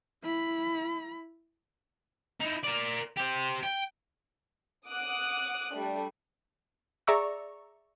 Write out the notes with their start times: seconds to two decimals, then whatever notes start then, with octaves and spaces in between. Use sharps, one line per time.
0.23 E4 B5
2.41 D#4 E4
2.64 A#4 D5
3.17 G4 C5
3.63 G5
4.88 F#5 D6 D#6 F#6
5.73 G3 A3 D4
7.07 G#4 D5 E5 A#5 C#6 E6